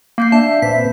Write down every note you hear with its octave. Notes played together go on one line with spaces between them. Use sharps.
A#3 F5 G6 C7
D4 E5 A5
A#2 C4 B4 B6